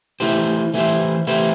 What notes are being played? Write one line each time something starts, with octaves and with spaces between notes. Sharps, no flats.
E3 A3 E4 G4 C5
E3 A3 E4 G4 C5
E3 A3 E4 G4 C5